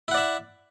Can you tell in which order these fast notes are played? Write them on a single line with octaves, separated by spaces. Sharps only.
E4 F#5 D5 E5